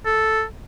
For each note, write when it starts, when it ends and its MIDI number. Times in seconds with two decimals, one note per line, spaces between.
0.06 0.43 69